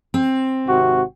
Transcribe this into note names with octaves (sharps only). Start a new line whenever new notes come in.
C4
G#1 C3 F#4